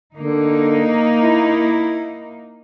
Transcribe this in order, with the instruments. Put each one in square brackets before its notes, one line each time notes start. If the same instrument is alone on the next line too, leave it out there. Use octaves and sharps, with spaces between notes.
[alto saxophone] D3 [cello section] A#3 D#4
[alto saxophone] E4